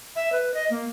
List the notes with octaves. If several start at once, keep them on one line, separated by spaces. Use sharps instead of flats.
E5
B4
D#5
A#3